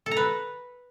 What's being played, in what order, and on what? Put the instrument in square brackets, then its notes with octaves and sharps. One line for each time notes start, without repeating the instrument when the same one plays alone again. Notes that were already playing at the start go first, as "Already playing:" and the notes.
[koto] A4
A#5
B4